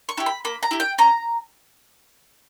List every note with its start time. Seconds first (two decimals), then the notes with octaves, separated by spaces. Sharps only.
0.09 C#6
0.17 E4 G4
0.26 B5
0.45 A#3 B5
0.63 A#5
0.71 E4 G4
0.80 G5
0.98 C#4 A#5